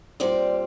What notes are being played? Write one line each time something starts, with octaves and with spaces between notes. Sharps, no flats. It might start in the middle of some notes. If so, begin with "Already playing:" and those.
A#2 G3 C4 D5